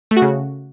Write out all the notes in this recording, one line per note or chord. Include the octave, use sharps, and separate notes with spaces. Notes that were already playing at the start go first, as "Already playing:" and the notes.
A3
F#4
C#3